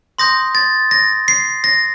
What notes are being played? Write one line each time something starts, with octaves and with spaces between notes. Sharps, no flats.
C6 D#6 G6 A#6
A6
A#6
C7
A#6